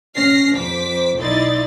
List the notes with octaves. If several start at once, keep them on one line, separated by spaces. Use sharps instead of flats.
C#4 F6 A#6 C7
F2 C5 D6 B6
B1 D#4 E4 D5 C6 A6